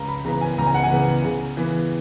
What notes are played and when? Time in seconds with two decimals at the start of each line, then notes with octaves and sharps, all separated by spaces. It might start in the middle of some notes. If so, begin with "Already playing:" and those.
Already playing: C#2 A#5
0.08 B5
0.25 C#3 E3 B3 A#5
0.41 G#5
0.58 C#2 A#5
0.67 G#5
0.74 F#5
0.83 G#5
0.91 C#3 E3 B3
1.25 C#3
1.57 E3 B3